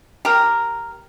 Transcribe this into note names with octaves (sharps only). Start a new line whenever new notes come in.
G4 A#4